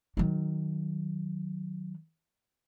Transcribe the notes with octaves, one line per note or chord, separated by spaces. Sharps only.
D#3 F#3